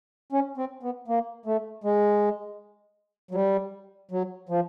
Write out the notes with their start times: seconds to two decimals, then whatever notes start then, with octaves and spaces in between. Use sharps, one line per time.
0.32 C#4
0.58 C4
0.83 B3
1.08 A#3
1.46 A3
1.84 G#3
3.31 F#3
3.34 G3
4.11 F#3
4.49 F3